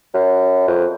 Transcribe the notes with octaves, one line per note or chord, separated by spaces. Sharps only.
F#2
F2